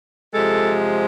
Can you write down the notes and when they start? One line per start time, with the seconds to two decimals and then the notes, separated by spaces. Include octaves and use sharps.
0.34 C3 F3 G#3 A4